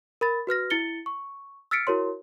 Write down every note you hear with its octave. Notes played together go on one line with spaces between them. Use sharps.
A#4 B5 A6
F#4 B4 F6 A#6
E4 A6 C#7 G7
C#6
E6 F6 A6 B6 C#7 D7
E4 F#4 A#4 C#5 C6